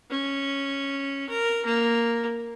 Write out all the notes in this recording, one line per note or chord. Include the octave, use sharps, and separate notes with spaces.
C#4
A#4
A#3